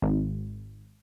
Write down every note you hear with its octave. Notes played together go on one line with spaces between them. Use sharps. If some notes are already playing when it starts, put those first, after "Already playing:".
G#1